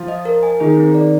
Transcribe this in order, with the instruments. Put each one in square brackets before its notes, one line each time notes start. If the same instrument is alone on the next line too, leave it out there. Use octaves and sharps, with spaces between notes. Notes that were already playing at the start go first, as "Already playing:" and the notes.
Already playing: [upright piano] F3 F4
[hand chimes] D#5
A#4
G#5
[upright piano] D#3 D#4 [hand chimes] G#4
[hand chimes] C4
D5